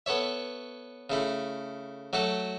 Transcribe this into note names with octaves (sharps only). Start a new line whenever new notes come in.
B3 A4 C#5 E5
C#3 A3 E4
F#3 A3 F#4 A4